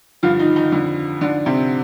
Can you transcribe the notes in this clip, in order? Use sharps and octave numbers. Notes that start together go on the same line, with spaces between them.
G2 D3 F3 F4
D#3 D#4
D#3 D#4
F2 D3 F3
G#2 D3 F3 D4
C3 C4